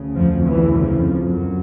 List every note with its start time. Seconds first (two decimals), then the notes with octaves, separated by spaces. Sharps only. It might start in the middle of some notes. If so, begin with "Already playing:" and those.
Already playing: D2 C#3
0.16 F2 F3
0.47 E2 E3
0.78 F2 F3
1.25 F#2 F#3